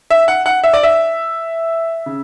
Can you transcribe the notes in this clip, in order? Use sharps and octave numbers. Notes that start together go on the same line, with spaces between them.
E5
F#5
F#5
E5
D5
E5
C#3